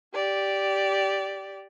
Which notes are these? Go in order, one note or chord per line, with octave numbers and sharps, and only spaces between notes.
G4 D5